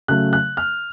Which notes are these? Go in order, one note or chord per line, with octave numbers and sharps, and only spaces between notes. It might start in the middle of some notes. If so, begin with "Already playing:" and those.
C#3 F#3 A3 F#6
F#6
F6